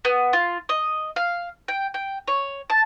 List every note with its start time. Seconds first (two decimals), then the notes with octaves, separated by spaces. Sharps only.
0.05 B3
0.33 F4
0.69 D#5
1.16 F5
1.68 G5
1.94 G5
2.28 C#5
2.70 A5